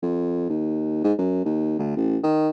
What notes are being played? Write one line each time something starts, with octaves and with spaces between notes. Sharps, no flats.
F2
D#2
G#2
F#2
D#2
D2
A1
D#3